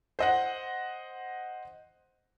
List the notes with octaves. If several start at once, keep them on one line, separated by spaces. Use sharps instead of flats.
C5 D#5 F#5